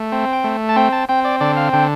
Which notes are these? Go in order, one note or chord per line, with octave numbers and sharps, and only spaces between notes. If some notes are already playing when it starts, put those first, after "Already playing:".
Already playing: A3
C4
G5
A3
A5
C4 G5
A5
C4 G5
D5
D3 D5
F5
D3 G5